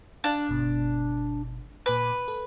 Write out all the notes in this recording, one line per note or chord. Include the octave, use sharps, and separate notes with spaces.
D4 D5 F5
G1 B2
A#2 B4 G#5 D6
A4